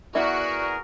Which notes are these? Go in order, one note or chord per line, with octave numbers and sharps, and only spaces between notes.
B3 E4 F#4 G#4 A#4 D5 E5